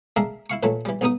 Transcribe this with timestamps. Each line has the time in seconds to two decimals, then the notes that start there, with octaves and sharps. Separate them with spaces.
0.16 G#3 D4 A#4 E5 F5
0.50 E4 F5 C#6
0.63 A#2 E3 F#3 A3
0.85 E3 G3
1.01 B1 G2 B3 D#4 D#6